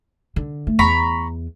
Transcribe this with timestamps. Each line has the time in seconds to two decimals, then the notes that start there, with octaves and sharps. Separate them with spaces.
0.36 D3
0.67 A3
0.79 E2 A#5 B5 C#6